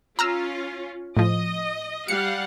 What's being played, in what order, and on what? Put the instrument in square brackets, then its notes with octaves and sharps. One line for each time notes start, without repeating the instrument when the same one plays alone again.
[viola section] C#4 F4 [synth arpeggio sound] A#5 E6 F6
[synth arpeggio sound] A2 F3 [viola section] D#5
[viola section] G3 F5 F#5 [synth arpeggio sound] C#7